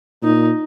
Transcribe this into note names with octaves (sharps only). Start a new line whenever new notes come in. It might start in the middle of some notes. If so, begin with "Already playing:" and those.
A#2 D#4